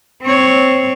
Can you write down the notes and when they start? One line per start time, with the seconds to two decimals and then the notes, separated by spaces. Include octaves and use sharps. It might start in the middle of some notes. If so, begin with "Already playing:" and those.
0.23 C4 C#5